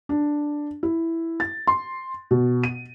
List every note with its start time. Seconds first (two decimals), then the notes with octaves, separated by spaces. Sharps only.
0.09 D4
0.83 E4
1.40 A6
1.67 C6
2.31 B2
2.64 D#7